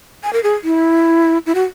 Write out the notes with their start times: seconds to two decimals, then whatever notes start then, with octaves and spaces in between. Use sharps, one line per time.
0.24 G#5
0.33 A#4
0.43 G#4
0.64 E4
1.46 E4
1.55 F#4